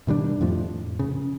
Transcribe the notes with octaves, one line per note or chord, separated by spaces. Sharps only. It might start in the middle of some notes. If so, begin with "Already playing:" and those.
B2 D#3 G3 D4
F2 A2 F3
C#3